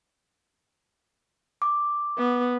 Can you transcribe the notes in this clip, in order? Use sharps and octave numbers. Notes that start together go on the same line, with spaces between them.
D6
B3